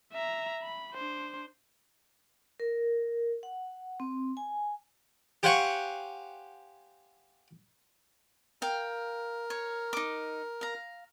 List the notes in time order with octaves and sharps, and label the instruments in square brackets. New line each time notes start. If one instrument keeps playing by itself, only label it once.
[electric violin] E5 A#5
B5
D4 C5
[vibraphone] A#4
F#5
C4
G#5
[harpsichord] G4 C5 F5 F#5 G#5 C#6
[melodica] A#4 [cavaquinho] F5 G5
[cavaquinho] C#5
D#4 D6
F5 A#5